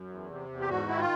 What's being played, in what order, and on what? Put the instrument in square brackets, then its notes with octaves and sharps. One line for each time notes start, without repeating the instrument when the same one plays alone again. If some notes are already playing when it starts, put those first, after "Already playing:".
Already playing: [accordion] F#2
E2
C3
E2
G4
G#2 F#4
D#3 E4
F4